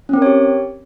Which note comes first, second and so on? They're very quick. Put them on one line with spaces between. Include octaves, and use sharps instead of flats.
C#4 C4 A#4 C#5 G4